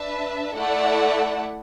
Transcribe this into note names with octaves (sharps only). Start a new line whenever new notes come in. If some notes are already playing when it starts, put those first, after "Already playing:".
Already playing: D4 B4 E5 A5
A3 E4 A4 D5 F#5